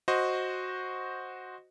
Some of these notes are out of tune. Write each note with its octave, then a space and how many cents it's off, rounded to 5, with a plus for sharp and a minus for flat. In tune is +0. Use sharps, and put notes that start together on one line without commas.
F#4 -5 C5 +0 D#5 +0